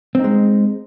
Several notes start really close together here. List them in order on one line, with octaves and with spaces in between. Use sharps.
C4 D#4 G#3